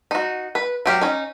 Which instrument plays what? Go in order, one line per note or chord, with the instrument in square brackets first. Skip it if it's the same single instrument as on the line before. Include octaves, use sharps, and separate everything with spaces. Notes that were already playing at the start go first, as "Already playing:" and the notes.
[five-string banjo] D#4 F#4
B4
F#3 G4 F5
C#4 D#4